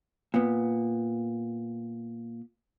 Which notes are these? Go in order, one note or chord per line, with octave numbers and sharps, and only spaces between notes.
A#2 B3